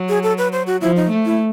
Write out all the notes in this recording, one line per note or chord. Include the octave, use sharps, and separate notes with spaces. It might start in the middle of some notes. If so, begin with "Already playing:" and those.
Already playing: F#3
G#4
A4
B4
C5
F#4
F3 E4
D#4
A3
E4